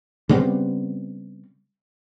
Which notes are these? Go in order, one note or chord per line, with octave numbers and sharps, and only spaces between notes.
C#3 G3 B3 C4